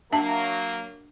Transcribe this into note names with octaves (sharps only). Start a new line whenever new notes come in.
F#3 A#3 D4 E5 A5